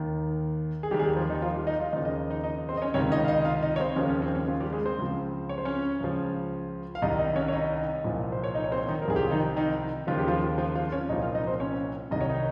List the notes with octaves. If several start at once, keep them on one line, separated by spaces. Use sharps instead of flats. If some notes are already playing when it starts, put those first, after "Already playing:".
Already playing: D#2 D#3
G#4
D#2 D#3 G3 G4 G#4
G3 G4
F3 F4
D#3 D#4
F3 F4
G3 G4
D#4 D#5
F4 F5
D#2 C#3 F3 D#4 D#5
D#4 D#5
D#4 D#5
D#4 D#5
C4 C5
D#5
C#4 C#5
C#2 C3 D#3 C#4 C#5
D#4 D#5
F5
D#4 D#5
F4 F5
D#4 D#5
C#5
C4 C5
D#2 C#3 F3 C#4
C#4
C4
C#4
F3 F4
G3 G4
G#3 G#4
C4 C5
C#2 C#3 F3
C#5
C5
C#4 C#5
C#2 C#3 F3
F5
C2 C3 D#3 D#4 D#5
D#4 D#5
C#4 C#5
C#5
D#4 D#5
C2 A#2 F3
C5
C#5
D#4 D#5
C#5
C4 C5
D#3 D#4
A#4
C2 C3 F3 G#4
G4
F4
D#3 D#4
D#3 D#4
D#2 C#3 F3 F4
G4
F3 F4
F3 F4
F3 F4
C#4 C#5
C2 A#2 F3 D#4 D#5
F4 F5
D#4 D#5
C4 C5
C#4 C#5
C2 C3 D#3 D#5
C#5
D#4 D#5